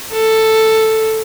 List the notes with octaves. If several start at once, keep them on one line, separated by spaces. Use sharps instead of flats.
A4